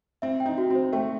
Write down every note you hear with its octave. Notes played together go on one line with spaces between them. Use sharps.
C4 E5
G5
D#4
F#4
C4
C5
A3 G5